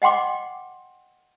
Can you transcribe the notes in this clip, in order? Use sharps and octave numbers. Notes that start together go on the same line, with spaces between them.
D#5 F#5 G5 C6 D6